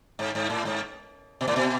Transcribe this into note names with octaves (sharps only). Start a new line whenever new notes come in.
G#2
G#2
A2
G#2
B2
A2
B2